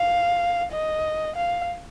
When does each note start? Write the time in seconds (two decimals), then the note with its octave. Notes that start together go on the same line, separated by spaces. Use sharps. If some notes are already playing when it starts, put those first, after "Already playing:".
Already playing: F5
0.72 D#5
1.36 F5